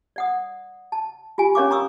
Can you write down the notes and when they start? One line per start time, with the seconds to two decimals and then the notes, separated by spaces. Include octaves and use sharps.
0.16 D5 F#5 D#6
0.92 A5
1.38 F4 G4 G#5
1.55 C#4 A#4 C#5 F5 C#6 D6
1.71 A#5 C#6 D#6 E6